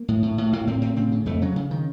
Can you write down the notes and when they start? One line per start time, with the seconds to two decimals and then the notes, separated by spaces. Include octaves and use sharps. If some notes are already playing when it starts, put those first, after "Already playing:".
Already playing: A#3
0.08 A2
0.22 A2
0.38 A2
0.53 A2 A#3
0.67 A2 C4
0.81 A2 C4
0.96 C#3 C4
1.12 C#3
1.26 F2 A3
1.41 C#3 F#3
1.56 C#3
1.71 D#3